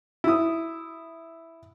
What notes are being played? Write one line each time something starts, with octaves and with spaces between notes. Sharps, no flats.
E4 D#6